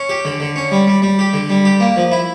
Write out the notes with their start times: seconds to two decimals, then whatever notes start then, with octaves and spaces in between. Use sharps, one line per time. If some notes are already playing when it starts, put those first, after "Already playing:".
Already playing: C#4
0.09 G4
0.25 D3
0.40 D3
0.56 C#4
0.72 G3
0.87 G3
1.02 G3
1.19 G4
1.34 D3
1.50 G3
1.65 G4
1.80 A#3
1.96 F3
2.12 E4